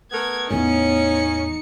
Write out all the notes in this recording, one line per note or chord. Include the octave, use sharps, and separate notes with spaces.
A3 B3 A#4 G#6
E2 A2 B3 C#4 D#4 C#7